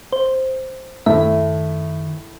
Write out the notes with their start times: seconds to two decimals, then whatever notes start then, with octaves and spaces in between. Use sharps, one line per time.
0.13 C5
1.06 F#2 A2 D#3 E5